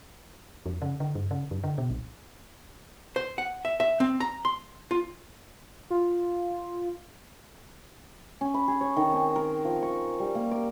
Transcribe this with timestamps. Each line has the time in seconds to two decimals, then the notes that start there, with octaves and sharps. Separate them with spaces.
0.66 F2
0.82 C#3
1.00 D3
1.15 G2
1.31 C#3
1.51 F#2
1.64 D3
1.78 B2
1.90 A#1
3.16 C5
3.38 F#5
3.65 E5
3.80 E5
4.00 C4
4.20 A#5
4.45 C6
4.91 F4
5.90 F4
8.41 C#4
8.54 B5
8.68 G#4
8.81 C#5
8.96 D#3
9.13 C4
9.36 A#4
9.65 F3
9.82 C#6
10.20 G3
10.35 A#3
10.51 D6